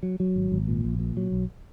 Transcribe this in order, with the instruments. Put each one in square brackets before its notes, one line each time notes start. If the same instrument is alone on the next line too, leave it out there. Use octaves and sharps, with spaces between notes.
[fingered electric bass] F#3
F#3
G#1
G#1
A#2
A#1
A#2
F#3
B1